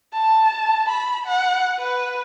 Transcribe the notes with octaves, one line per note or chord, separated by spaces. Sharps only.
A5
B5
F#5
B4